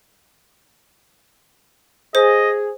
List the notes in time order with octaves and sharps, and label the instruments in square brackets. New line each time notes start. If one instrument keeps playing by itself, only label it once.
[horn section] G#4 [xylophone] C5 [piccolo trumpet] D#5